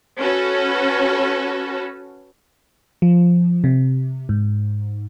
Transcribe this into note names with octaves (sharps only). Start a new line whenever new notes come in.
C#4 F#4 A4 B4
F3
C3
G#2